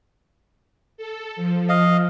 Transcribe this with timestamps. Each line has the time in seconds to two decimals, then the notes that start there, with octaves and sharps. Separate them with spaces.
0.97 A4
1.36 F3
1.69 D#5 F5